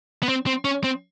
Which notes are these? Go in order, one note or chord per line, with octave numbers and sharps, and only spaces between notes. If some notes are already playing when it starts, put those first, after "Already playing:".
B3
C4
C4
C#4
C4